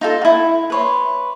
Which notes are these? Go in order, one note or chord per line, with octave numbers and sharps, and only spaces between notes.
D#4 F4 A4
E4 F#4
B4 C#5 C6